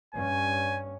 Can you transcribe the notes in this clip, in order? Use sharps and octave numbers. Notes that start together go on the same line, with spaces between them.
G2 C#4 G#5